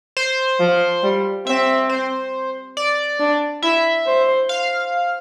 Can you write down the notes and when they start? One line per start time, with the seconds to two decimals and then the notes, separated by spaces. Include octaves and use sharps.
0.17 C5
0.60 F3
1.03 G3
1.46 C4 E5
1.89 C5
2.77 D5
3.19 D4
3.62 E4 E5
4.06 C5
4.49 F5